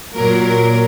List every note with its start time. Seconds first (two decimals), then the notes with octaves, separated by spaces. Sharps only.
0.14 A#2 F#3 A#4
0.44 A#4